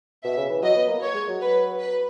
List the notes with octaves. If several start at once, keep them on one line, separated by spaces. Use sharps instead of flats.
B2 E5
C#3
E3
F#3 D#5
B3
A#3
C#5
G#3
F#3
B4
B4